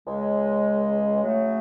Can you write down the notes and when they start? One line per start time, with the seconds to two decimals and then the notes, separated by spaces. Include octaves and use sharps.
0.07 C#2 C#3 G#3
1.23 C#3 F#3 A3